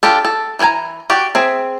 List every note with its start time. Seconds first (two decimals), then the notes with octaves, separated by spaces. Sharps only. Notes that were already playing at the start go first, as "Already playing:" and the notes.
0.03 D4 F4 G4 A4
0.25 A4
0.59 E3 D#4 E4 G#5 A#5
1.10 F#4 G4 D5
1.35 C4 G#4 E5